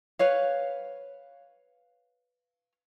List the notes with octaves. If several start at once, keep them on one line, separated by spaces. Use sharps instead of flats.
B4 C#5 F5